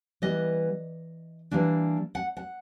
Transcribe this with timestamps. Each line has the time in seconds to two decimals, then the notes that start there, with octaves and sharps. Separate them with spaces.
0.22 E3 G3 B3 D#5
1.51 E3 G3 A#3 D4
2.15 F#5
2.37 F#5